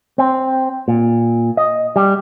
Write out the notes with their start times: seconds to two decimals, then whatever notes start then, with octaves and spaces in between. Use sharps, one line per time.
0.18 C4
0.88 A#2
1.57 D#5
1.96 G3